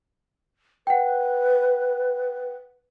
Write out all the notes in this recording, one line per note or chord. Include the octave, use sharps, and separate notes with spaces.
B4 F#5 G5